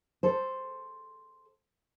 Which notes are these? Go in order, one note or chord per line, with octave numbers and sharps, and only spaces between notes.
A4 C5